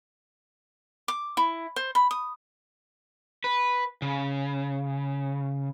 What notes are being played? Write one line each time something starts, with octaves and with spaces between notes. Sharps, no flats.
D6
E4
C5
B5
D#6
B4
C#3